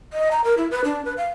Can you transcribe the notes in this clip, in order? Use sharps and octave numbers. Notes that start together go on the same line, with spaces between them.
D#5
A#5
A#4
E4
B4
D4
B4
F5